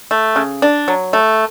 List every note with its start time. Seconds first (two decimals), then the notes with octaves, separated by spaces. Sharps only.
0.11 A3
0.36 C#3
0.62 D4
0.88 F#3
1.13 A3